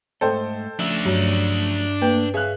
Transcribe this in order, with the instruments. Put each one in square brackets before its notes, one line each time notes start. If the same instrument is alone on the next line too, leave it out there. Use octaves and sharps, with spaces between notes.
[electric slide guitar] G#2 A3 D#5 [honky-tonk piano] A4 C5 G5
[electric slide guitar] F3 A3 C#4 [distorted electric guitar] D4 E5
[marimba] G2 [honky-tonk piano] F#3
[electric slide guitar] A3 A#3 [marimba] B4 [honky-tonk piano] G5
[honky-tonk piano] G#4 F#6 [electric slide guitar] C#5 E5 F5